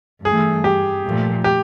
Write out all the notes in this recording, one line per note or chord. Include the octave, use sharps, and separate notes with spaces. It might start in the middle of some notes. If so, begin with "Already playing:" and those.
G2 E3 A3 G#4
G4
A#2 F3 A3
G4